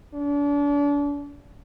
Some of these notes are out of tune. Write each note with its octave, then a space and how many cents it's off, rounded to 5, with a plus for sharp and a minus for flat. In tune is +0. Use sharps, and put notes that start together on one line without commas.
D4 -35